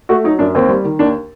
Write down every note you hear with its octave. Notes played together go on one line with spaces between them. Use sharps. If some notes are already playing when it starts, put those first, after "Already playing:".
A3 F#4
F#3 D#4
F#2 D4
D#2 C4
G3
D#3
D#2 D4